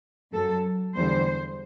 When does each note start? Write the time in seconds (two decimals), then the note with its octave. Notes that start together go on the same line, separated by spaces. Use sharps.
0.33 F#2 F#3 A4
0.95 E2 D3 G3 C5